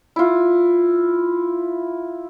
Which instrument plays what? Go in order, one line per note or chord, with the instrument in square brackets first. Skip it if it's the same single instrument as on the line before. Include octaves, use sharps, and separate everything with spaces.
[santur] E4 F4